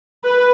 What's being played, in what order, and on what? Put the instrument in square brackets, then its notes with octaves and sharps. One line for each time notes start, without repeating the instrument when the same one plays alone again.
[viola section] B4